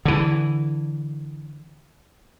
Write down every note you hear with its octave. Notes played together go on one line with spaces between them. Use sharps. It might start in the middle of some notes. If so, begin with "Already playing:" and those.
D3 E3